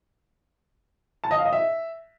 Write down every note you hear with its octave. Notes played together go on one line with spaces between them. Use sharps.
A5
D#5
F5
D#5
E5